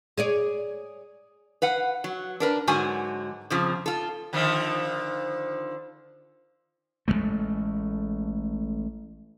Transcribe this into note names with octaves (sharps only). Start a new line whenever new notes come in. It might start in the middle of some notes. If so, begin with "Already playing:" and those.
G#4 C#5 D5
B4 F5 F#5
F#3
D4 A#4 B4
G#2 D3 F#3 F#4 G#5
F2 C#3 F3
F4 A4
D3 D#3 F3
A1 D#3 G#3 A3